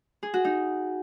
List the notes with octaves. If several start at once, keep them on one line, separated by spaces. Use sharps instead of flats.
G#4
F#4
D#4